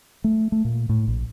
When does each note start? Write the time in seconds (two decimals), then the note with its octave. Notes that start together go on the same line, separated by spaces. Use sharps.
0.24 A3
0.52 A3
0.65 A#2
0.89 A2
1.08 A#1